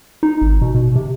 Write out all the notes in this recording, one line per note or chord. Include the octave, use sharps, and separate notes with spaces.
D#4
G#1
B2
B2
C3